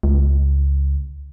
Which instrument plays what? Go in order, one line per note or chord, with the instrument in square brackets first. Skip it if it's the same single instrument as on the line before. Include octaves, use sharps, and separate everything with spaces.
[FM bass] C#2